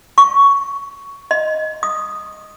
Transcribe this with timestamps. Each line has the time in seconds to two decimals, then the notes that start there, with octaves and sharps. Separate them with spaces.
0.18 C#6
1.31 D#5
1.83 D#6